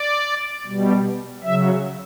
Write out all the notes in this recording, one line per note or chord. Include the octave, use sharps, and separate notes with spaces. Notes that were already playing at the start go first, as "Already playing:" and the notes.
Already playing: D5
B2 G3
C#3 F#3 E5